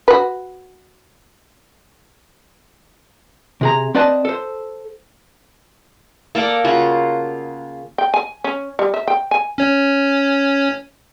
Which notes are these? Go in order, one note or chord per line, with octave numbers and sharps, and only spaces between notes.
F#4 B4
C3 G#4 A#5
C4 B4 D5 D#5 A5
A4 C5
A#3 A4 A#4 D5
C#3 F4 F#4
G5
G#5
C#4
G3
E5
G5
G#5
C#4 C#5